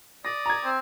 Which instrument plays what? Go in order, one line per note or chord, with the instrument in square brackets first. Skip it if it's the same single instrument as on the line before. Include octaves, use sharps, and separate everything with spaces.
[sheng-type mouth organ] D5 D#6 [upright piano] A#6
[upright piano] A#5 G#6
[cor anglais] C4